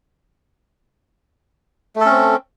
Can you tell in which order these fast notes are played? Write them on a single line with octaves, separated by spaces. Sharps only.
A3 A4 C#4 C4